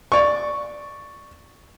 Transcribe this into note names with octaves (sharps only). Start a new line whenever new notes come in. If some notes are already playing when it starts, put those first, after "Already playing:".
D5 C#6